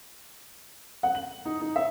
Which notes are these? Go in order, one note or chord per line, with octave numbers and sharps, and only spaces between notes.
F#5
F#7
D#4
D#4
E5